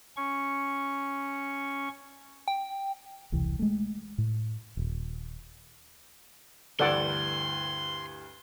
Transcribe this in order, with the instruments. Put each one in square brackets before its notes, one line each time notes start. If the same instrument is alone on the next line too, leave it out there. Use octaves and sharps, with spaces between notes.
[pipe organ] C#4 C#6
[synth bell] G5
[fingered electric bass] E1 C2 E3
G#3 A3
A2
D#1
[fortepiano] D2 G2 E3 [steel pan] A4 D5 F#5 [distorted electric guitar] C6